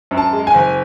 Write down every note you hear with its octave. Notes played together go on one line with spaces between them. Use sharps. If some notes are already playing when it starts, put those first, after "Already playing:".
F#2
A5
G#3
G#5
F#1